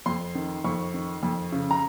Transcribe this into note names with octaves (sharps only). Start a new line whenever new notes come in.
F2 C6
D#3
F2 C#6
D#3
F2
C#3
A#5